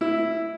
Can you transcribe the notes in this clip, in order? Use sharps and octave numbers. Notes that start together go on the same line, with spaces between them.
E4